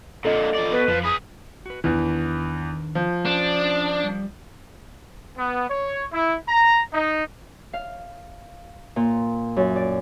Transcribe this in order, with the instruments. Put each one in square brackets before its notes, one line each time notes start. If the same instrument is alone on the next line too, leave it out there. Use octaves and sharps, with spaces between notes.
[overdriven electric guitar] A#2 D3 [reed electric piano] A4 D#5
[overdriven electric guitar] F3 D5
[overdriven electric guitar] B2 [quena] B4
[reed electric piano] F2 [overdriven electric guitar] F3
[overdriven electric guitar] G#4 B4 [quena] D#6
[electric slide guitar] F#4 B4
[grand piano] E2 E3 [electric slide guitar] D#3 D4
[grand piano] F3
[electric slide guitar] C#4 C5 [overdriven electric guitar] D4
[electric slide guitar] G3
[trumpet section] B3
C#5
E4
A#5
D#4
[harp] F5
A#2
F#2
D5